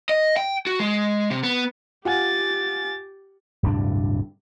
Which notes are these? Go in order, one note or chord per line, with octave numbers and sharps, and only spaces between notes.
D#5
G5
F#4
G#3
C3
B3
F4 G4 F#5 G#5 A6
D1 G2 C3 D4